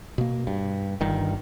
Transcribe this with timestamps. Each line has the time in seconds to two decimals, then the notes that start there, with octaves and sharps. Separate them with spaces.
0.18 B2 A#3
0.47 G2
1.01 G1 G2 D#3